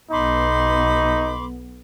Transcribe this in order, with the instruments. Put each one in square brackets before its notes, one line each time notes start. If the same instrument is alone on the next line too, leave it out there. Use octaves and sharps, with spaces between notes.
[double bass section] B1 B3 [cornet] D#4 [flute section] B5 C6 D6